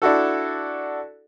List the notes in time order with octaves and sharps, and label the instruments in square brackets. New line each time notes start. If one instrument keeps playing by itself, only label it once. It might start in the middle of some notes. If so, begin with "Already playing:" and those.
[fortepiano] D4 E4 F#4 A4